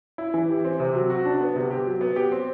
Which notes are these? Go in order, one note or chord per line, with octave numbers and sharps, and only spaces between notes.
E4
E3
G4
C4
C3
F#3
F#4
D4
B3
C3
G4
F#3
B3
G4
C4